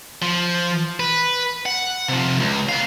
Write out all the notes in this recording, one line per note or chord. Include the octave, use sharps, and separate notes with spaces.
F3
B4
F#5
C3 F3
C#2
B3 F5